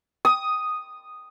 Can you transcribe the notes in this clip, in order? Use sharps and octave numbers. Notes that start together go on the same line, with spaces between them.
D#6